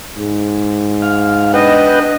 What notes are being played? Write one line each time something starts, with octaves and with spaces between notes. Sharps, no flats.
G#2
F5
D4 B4 D#5 F#5 G5